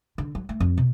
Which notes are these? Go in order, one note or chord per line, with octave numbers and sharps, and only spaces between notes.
D3
F#3
A3
F2
B2